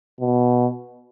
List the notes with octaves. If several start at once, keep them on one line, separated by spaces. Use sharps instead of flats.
B2